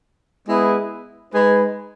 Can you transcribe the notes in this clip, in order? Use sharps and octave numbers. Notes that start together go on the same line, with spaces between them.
G#3 B3 E4 G#4 B4
G#3 D#4 G#4 B4